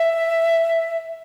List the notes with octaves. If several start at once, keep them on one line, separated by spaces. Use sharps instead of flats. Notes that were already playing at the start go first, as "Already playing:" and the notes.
Already playing: E5